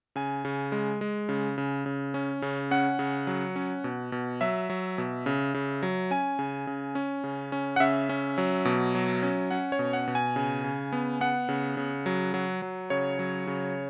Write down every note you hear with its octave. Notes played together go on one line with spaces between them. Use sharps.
C#3 G#5
C#3
G#3
G#3
C#3
C#3
C#3
C#4
C#3
C#4 F#5
C#3
F#3
C#4
B2
B2
F#3 E5
F#3
B2
C#3
C#3
F#3
C#4 G#5
C#3
C#3
C#4
C#3
C#4
F#5
C#3 E5
C#4
F#3
B2
F#3
C#4
C#4 F#5
C#5
B2
F#5
B2
G#5
C#3
C#3
B3
B3 F#5
C#3
C#3
F#3
F#3
F#3
C#3 C#5
F#3
C#3